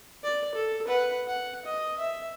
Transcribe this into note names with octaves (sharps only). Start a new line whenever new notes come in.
D5
A4
B4 F#5
F#5
D#5
E5